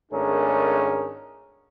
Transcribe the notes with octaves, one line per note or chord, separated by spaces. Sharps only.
G#1 A3 C#4 D4 G#4 A#4